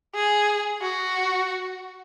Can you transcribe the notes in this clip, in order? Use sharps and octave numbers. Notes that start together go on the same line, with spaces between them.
G#4
F#4